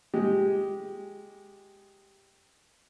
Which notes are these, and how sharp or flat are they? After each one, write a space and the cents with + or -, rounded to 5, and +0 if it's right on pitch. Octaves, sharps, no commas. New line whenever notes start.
G#3 +0 G4 -5